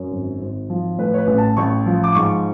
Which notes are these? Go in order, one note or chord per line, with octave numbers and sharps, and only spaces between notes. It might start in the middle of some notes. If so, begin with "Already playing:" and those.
Already playing: F#2 C#5
G#1
G#1
F3
A2 B4
C#5
B4
A1
A5
A1 C#6
F3
D6
G#2 C#6